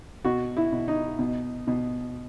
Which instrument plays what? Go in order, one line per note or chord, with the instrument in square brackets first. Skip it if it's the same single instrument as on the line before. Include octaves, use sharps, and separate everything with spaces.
[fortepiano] B2 F#4
E4
B2
D#4
B2
B2